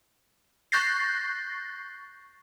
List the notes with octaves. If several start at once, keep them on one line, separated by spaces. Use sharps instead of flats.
C#6 F#6 G6 A6 A#6 C7